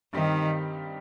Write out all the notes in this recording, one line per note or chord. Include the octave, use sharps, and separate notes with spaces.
G2 D#3 G3 C4 D#4 G4